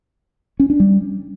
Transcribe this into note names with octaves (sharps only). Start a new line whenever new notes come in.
C#4
D4
G3